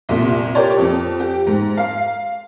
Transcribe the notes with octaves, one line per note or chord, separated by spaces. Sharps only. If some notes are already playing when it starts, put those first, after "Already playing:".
C2 A#2
G4 A#4 C#5 D5
F2
G4
G#2
F5